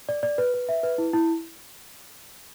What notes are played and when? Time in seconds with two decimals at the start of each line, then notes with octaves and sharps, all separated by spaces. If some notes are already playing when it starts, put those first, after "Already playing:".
0.09 D5
0.23 D5
0.38 B4
0.54 B4
0.69 E5
0.83 B4
0.98 E4
1.13 E4